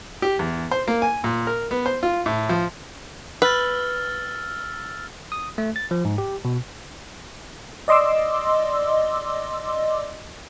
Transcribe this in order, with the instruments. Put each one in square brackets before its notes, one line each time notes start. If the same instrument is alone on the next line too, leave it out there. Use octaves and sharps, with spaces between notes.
[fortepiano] G4
E2
C5
A#3
G#5
A#2
A#4
B3
C5
F4
A2
F3
[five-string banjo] B4 [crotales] E6 F6 A6
[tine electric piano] D#6
A3
A6
F3
G#2
G4
B2
[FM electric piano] D5 D#5 C6 D6 E6